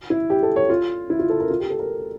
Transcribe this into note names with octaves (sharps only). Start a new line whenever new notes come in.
E4
G4
A4
C#5
F4
E4
F4
A4
A#4
F4
G4
A4
A#4